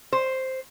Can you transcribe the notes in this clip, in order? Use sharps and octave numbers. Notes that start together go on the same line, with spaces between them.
C5